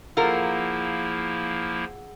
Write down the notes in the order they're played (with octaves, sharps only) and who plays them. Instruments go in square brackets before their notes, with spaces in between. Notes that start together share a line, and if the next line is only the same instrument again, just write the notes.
[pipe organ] F3 A#3 E4 [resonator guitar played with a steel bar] F4 A#4 [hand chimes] G#4 F#5 E6